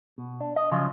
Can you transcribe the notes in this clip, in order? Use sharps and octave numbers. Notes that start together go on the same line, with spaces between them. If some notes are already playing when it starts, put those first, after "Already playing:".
B2
D4
D#5
C#3 F3 F#3 F4